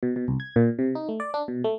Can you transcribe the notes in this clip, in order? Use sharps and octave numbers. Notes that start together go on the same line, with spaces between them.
B2
B2
C2
G#6
A#2
C3
D#4
A3
D5
D4
B2
A3